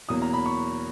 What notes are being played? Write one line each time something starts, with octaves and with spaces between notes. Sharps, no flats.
E2 B2 F#3 A#3 D#6
A#5
B5
C#6